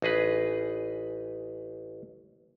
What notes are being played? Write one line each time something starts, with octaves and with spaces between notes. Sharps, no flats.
A1 D#4 G#4 B4